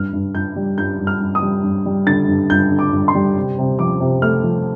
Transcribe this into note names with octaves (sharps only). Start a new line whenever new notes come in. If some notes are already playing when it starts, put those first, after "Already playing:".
Already playing: G2 F6
G2
G2 G6
G3
G2 G6
G2
F6
G2
D#6
G3
G2
G3
D3 A6
G2
G2 G6
D3
D6
G2
C6
G3
C3
C3
F3 D6
C3
A3 F6
F3